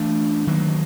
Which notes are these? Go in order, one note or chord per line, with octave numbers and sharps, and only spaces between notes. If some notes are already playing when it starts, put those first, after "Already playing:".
Already playing: E3 A3 D4
D#3 F#3 A#3